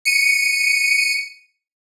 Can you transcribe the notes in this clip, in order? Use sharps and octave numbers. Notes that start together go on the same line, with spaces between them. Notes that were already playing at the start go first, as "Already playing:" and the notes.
C#7 D#7